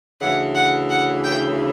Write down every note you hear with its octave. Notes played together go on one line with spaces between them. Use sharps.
D2 C#3 E3 F#5
F#5
F#5
G5